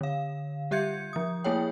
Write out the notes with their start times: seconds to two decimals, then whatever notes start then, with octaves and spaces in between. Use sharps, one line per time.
0.01 D3 F5
0.71 G3 G4 E5 G6 G#6 C#7
1.13 F3 D#6
1.44 A3 A#3 E4 G#4 C#5 G5